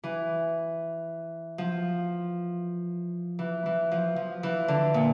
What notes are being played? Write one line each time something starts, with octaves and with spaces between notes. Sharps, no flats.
E3
F3
E3
E3
F3
F3
E3
D3
A#2